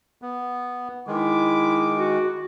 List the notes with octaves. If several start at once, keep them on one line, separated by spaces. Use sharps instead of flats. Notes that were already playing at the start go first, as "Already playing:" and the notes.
B3
D#3 G#3 E4 D6
F#4